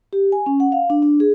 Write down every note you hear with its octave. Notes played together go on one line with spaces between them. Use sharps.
G4
G#5
C#4
F#5
F5
D4
D4
G#4